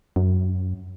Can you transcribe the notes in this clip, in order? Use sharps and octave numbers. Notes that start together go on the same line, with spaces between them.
F#2